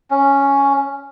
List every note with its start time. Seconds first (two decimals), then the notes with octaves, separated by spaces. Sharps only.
0.11 C#4